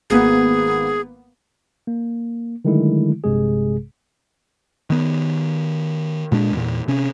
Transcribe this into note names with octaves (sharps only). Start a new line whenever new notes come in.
G#1 A#3 B3 G#4
A#3
D3 D#3 F#3 G#3 A3 E4
A#1 G2 C3 G#3 G#4
D#3 B3
A#2 G#3 D4
E2 A#2
C3 C#4